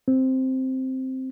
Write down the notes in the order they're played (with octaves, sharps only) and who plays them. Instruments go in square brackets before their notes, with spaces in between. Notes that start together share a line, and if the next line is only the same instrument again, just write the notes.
[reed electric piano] C4